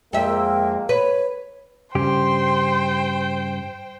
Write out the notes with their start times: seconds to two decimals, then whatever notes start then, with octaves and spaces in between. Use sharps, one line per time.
0.13 F2 G#3 A#3 E5 G5
0.89 B4 C#5
1.95 G2 C#3 G4 C5 G5 C6